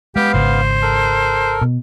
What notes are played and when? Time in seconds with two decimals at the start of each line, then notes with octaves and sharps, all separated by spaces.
0.16 G#3 B3 G4 F5
0.34 G#1 C#3 G#3 C5
0.82 A4 A#4
1.61 B2